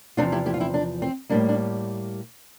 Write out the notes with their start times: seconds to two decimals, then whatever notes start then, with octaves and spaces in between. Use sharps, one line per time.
0.17 E2 C3 F3 D4 F4
0.32 E4 G4
0.46 E4 G4
0.54 F4
0.60 C4 E4
0.74 D4
1.02 C4
1.30 A2 G3 A#3 D4
1.49 D4